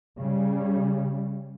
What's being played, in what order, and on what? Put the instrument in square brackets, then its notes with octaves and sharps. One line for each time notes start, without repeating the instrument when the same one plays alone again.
[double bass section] C#3 G3